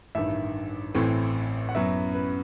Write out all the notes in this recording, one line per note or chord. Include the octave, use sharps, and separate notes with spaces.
A1 G2 D#3 E5
A1 A2 E3 A3 C4
F#5
F#2 F#3 B3 E5
B4